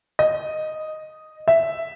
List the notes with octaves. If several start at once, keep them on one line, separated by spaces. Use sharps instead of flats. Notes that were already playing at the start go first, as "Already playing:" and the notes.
D#5
E5